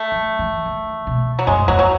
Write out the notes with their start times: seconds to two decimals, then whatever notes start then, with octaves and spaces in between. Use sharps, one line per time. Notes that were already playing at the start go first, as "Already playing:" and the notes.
Already playing: A3
0.12 F#3
0.39 E3
0.65 D#3
1.07 B2
1.39 F#3
1.47 F#2 G#3
1.68 E2 F#3
1.79 F#3